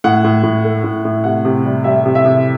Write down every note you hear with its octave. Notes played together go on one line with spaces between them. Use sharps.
A2 F#5
A2
A2
A3
A2
A2
C3 F#5
C3
G3
G3 E5
C3
E5
C3